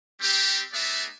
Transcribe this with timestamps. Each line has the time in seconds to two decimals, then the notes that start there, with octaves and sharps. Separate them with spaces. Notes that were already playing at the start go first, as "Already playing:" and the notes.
0.21 G3 C4 G4
0.74 A3 B3 D#4 G#4 D5 E5